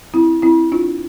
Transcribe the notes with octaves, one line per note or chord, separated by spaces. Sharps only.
C4 E4
C4 E4
D4 F4